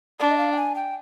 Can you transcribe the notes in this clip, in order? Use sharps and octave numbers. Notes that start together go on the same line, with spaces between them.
D4 D5
D#5
F5
G5
G#5
G5